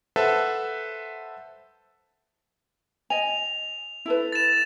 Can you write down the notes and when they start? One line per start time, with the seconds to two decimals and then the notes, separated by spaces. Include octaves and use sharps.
0.16 A4 B4 C5 E5 F#5 A5
3.10 D#5 G#5 F7
4.06 E4 A4 B4
4.32 A6 E7